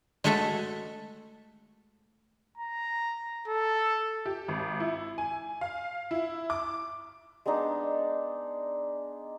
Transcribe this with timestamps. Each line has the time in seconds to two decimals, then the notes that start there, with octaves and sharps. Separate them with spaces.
0.24 G#3 A3 F#4 A4 E5 F#5
2.58 A#5
3.48 A4
4.26 G4
4.48 G#1
4.80 E4
5.18 G#5
5.61 F5
6.11 E4
6.50 D6
7.46 G#3 B3 D4 D#4